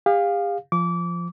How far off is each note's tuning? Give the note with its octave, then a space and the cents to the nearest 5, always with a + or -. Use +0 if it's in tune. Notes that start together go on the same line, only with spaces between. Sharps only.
G4 +45 F5 +10
F3 -15 D6 -25